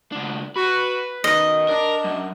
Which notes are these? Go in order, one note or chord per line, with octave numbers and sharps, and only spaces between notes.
C#2 D4
F#4 B4
F#2 B2 D#3 D#5
D4 A#4
F#2